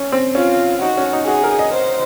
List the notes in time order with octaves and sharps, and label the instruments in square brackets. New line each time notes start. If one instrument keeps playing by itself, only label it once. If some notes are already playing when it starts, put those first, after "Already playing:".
Already playing: [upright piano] C#4
C4
[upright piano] C#4 [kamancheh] F4
[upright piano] D#4 [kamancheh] F#4
[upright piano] C#4
D#4
[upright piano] F#4 [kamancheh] G#4
[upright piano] A#4
D#5
[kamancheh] C5